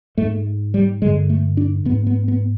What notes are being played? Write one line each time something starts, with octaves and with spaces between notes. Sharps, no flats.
G#2 A3
G3
G2 D3 G#3
A3
D4
G#2 B3
B3
B3